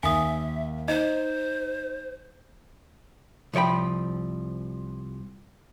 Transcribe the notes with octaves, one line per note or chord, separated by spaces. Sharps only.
D#2 E5 G#5 D#6
D#4 C5 D#5
C2 F3 C#5 G5 B5